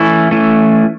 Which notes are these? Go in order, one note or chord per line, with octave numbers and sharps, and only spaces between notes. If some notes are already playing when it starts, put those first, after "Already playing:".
Already playing: E3 A3 C#4 E4
E3 A3 C#4 E4